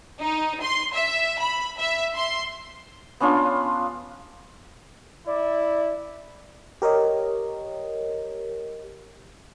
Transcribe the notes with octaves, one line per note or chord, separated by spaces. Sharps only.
D#4
C6
E5
B5
E5
C6
B3 C#4 D4 F4
E4 D5
G4 A#4 C#5 D#5